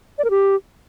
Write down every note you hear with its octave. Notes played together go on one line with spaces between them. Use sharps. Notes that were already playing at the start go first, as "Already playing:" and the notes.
D5
A#4
G4